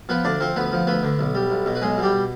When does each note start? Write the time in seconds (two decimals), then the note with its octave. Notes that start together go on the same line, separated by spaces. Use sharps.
0.09 F3 B3 B4
0.24 D2 D4 D5
0.40 F3 C4 C5
0.56 D2 B3 B4
0.72 F3
0.87 D2 B3 B4
1.03 D3
1.19 B1
1.35 G3
1.50 B1
1.66 B2
1.75 B4
1.82 B1 G#3 G#4
1.97 B2
2.02 G3 G4